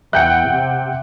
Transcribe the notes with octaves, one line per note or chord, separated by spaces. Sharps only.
E2 E5 F#5 G5 F#6 G6 C#7
C3